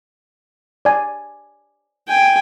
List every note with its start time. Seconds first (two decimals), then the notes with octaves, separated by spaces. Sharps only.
0.85 D5 G#5
2.08 G5 G#5